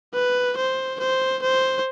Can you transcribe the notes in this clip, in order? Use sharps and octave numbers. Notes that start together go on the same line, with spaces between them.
B4
C5
C5
C5